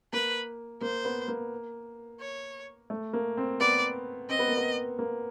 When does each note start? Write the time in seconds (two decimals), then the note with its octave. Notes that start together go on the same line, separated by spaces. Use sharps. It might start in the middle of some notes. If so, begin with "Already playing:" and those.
0.13 A#3 B4
0.81 A#3 C5
1.05 B3
1.28 A#3
2.20 C#5
2.90 A3
3.13 A#3
3.37 C4
3.60 B3 D5
4.29 C4 D#5
4.39 B3
4.48 A#3
4.57 B3
4.99 A#3